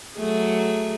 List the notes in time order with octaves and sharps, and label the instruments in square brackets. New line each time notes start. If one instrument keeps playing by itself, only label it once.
[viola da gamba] F#3 A3 G#4